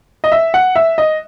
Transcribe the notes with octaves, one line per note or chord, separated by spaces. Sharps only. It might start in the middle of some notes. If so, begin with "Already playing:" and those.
D#5
E5
F#5
E5
D#5